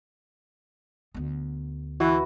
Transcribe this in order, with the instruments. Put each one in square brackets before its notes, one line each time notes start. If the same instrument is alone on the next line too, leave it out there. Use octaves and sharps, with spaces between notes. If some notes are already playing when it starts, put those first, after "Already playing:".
[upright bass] D2 B3
[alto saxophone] E3 [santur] E4 F#4 B4